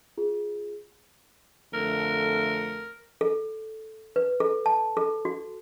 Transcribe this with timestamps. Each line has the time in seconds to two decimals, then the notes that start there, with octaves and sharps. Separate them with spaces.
0.17 F4 G#4
1.73 F2 D3 A3 A#4
3.21 A4
4.16 B4
4.40 A4
4.66 A5
4.97 A4
5.25 F#4